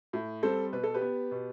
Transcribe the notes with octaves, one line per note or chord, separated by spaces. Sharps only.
A2
G3 C4 A4 C5
B2 B4
A4
G4 B4
B3
B2